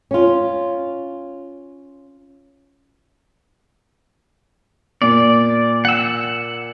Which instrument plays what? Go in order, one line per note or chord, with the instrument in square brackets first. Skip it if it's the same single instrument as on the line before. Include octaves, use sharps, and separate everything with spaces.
[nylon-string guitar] C#4 F4
[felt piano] A#2 [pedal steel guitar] D5
[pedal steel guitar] F#5 E6